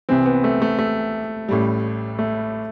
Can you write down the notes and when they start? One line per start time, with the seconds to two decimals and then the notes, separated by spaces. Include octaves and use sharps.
0.09 C2 C3 E3 C4
0.26 B3
0.44 A3
0.62 A3
0.79 A3
1.49 A1 A2 G3
2.19 A3